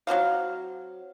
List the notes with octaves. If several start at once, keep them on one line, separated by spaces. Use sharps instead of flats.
F#3 C4 F#4 F5